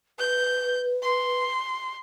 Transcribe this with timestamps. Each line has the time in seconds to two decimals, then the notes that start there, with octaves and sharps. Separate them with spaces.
0.19 B4 G6
1.03 C6